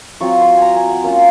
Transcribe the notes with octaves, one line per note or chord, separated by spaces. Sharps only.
F#3 C4 F4 C#6
C6
G#5 A#5
G#5
F#5
A#3 C#4 F4